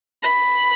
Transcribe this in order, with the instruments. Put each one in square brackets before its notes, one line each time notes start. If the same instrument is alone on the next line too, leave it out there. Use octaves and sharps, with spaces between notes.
[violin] B5